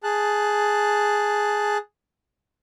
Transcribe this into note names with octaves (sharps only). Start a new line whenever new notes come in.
G#4 A5 F#6